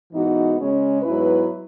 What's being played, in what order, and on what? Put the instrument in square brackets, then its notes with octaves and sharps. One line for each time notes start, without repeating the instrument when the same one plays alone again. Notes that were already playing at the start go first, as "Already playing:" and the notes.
[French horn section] G#2 E3 B3 D#4 F#4
C#3 G#3 C#4
G#2 F#3 B3 E4 B4